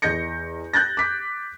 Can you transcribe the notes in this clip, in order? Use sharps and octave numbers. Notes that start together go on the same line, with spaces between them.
E2 D#5 G6 A#6 C#7
F#6 G6 A6 A#6
D6 B6